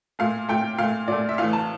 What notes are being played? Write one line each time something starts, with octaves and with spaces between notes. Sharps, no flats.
A#2 A3 F5
A#2 A3 G5
A#2 A3 F5
A#2 A3 D5
E5
A2 E3 A3 F5
A5